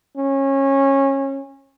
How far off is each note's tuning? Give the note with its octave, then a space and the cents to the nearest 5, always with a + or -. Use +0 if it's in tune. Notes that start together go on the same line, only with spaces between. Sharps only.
C#4 -25